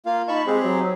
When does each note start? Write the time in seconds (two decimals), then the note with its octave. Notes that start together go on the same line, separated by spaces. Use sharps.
0.06 A#3 F4 F5
0.28 D#4 A5 B5 C#6
0.46 G#3 C4 G4 G#4
0.63 F#3